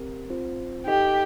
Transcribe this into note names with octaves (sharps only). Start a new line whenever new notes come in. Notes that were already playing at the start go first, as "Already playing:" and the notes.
Already playing: C4 G4 A#4
C4 F4 C5
D#4 G4 A4 D#5 G5